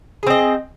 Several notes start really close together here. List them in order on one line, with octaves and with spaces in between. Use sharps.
G#4 C4 D#5